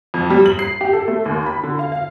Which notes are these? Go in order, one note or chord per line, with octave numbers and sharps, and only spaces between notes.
F2
G3
F#7
C7
G4
A4
A3
D#2
B5
D3
F5
F5